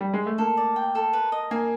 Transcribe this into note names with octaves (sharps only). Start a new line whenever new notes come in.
G3
G#3
A3
A#3 A4
D5
G5
A4
B4
D#5
A#3 G#5